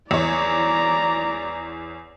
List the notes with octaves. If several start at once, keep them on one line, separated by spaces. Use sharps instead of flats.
E2 C#5 D5 A#5